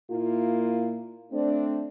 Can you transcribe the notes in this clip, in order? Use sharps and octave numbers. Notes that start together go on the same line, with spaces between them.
A#2 A#3 E4 F4
A3 C4 D4